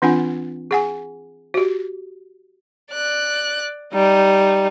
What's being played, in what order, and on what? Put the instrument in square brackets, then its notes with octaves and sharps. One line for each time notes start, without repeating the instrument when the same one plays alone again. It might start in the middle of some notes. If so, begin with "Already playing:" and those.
[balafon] E3 C4 D4 F4 F#5 G#5
G#4 F#5 G#5
F#4 G4
[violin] D5 F#6
[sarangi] G3 [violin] D#4